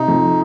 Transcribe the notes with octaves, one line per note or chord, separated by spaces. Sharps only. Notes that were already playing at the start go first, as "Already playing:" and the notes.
Already playing: C3 D#4
F2